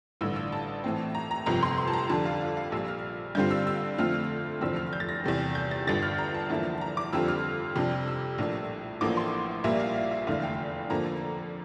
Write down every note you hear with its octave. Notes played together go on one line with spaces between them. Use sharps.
A1 G2 D3 E6
E6
A5
A2 E3 A3 C4
A#5
A#5
G1 F2 C3 A#5
C6
C6
A5
A#5
F2 D3 G3 D4 A5
F5
F5
F5
A#1 A#2 G3 E6
F6
G2 D3 G3 C4 F4 G6
E6
E6
F2 D3 A3 C4 F4 F6
F1 E2 D3 F3 C4 E6
F6
G6
A6
A#6
E2 C3 G3
G6
A6
G1 G2 D3 A6
F6
A#5
A5
E2 D3 F3 A#3 E4
A#5
D6
F2 D3 G3 C4 F4 E6
F6
F2 C3 G3 D4
E6
A#1 A2 G3 A#3 D4
A1 A2 F3 A#3 D4 D6
C6
A#1 A#2 G3 A#3 E5
F5
F5
E5
F1 E2 D3 A3 F5
G5
F2 D3 F3 A#3 A#5